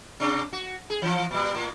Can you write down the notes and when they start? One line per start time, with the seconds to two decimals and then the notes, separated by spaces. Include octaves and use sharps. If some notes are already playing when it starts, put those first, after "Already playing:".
0.20 C3 D4
0.53 F#4
0.90 G#4
1.02 E3 F3
1.31 A#2 G3
1.54 A2